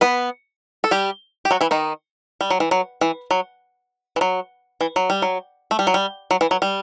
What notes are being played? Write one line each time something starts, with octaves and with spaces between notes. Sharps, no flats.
B3 B4
A4
G3 G4
G4
F#3 F#4
E3 E4
D#3 D#4
G3
F#3
E3
F#3
E3
F#3
E3
F#3
E3
F#3
G3
F#3
A3
G3
F#3
G3
F#3
E3
F#3
G3